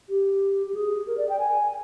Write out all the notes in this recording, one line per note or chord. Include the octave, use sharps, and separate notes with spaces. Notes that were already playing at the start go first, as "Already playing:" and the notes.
G4
G4
G#4
A#4
D5
G5
G#5